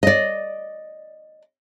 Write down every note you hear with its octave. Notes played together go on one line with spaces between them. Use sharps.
D5 D#5